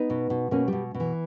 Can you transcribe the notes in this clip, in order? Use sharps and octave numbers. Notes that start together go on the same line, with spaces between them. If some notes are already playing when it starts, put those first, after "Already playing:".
Already playing: B3 D#4
B2
B2
B2 A#3 C#4
B2 G3
B2
E3